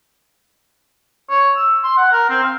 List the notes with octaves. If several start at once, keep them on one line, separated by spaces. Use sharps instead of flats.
C#5
E6
C6
F#5
A#4
C4
F5